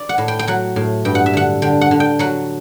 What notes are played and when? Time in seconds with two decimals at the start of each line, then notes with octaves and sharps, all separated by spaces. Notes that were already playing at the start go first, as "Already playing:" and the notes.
Already playing: D5
0.09 F#5
0.18 A2
0.28 G5
0.39 G5
0.47 F#3 F#5
0.76 A2
1.05 G2 G5
1.15 F#5
1.26 E5
1.33 D3 F#5
1.62 D3 G5
1.81 F#5
1.91 D3
2.00 G5
2.19 F#3 F#5